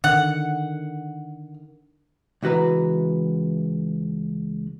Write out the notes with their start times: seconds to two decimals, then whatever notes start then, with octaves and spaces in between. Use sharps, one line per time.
0.04 D3 D#3 F#5
2.43 C#2 E3 F#4 B4 A#5